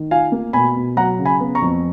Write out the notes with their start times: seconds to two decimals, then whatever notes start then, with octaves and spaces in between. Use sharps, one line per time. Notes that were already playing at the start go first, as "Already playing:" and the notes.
Already playing: D#3
0.11 F4 F5 G#5
0.32 A#3
0.53 B2 G#5 B5
0.76 B2
0.97 F#3 F#5 A#5
1.19 C#3
1.25 G#5 B5
1.41 B3
1.55 A#5 C#6
1.62 F2